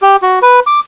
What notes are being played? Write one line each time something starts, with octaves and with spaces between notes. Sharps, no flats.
G4
F#4
B4
D6